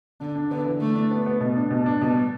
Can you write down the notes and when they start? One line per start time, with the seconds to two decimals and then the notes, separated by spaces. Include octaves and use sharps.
0.20 D3 D4
0.35 D4
0.51 D3 B3
0.65 E3
0.81 E3 A3
0.95 D4
1.11 B3
1.26 B3
1.41 B2
1.56 D4
1.71 B2
1.86 D4
2.01 B2 G3